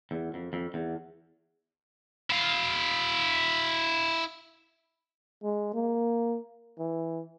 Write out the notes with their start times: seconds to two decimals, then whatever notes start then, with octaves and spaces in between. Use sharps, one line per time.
0.11 E2
0.34 F2
0.53 F2
0.74 E2
2.30 E4 F5
5.44 G#3
5.74 A#3
6.79 E3